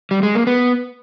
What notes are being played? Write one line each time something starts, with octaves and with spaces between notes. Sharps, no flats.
G3
G#3
A#3
B3